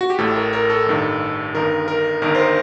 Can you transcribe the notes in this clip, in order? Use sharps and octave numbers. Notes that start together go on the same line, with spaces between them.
F#4
G4
A1 A2 A4
A#4
A#4
A4
A1 G2 D#3
G1 G2 D#3 A#4
A#4
G1 G2 D#3 A#4
C5
A#4